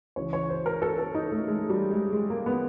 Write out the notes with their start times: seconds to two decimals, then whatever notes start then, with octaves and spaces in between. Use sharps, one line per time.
0.16 C#2 C#3 E3 C#5
0.33 C#5
0.50 C5
0.66 A#4
0.82 A4
0.98 A4
1.15 D#4
1.32 A3
1.47 G#3
1.70 G3
1.91 G#3
2.13 G#3
2.30 A#3
2.46 B3